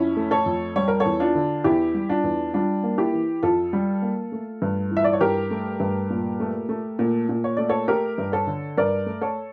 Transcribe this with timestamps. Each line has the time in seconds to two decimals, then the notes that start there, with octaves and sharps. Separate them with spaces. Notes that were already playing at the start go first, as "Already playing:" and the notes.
Already playing: F2 C#4 E4
0.17 A3
0.31 A4 C#5
0.46 F2
0.76 G3 C#5
0.88 A#4
1.00 A4 C#5
1.06 E2
1.20 D4 F4
1.35 D3
1.64 E2 E4 G4
1.94 G3
2.09 D4 F4
2.24 E2
2.54 G3 D4 F4
2.83 A#3
2.98 E4 G4
3.13 E3
3.43 F2 F4 A4
3.73 G3
4.02 A#3
4.32 A3
4.62 G2
4.91 E3
4.97 E5
5.04 D5
5.13 C#5
5.21 G2 G4 A#4
5.51 A3
5.80 G2
6.10 A#2
6.40 A3
6.69 A3
6.99 A#2
7.29 A#2
7.44 C#5
7.57 A3 D5
7.69 A4 C#5
7.88 A3 G4 A#4
8.18 G2
8.32 A4 C#5
8.47 D3
8.77 G2 A#4 D5
9.06 A3
9.22 A4 C#5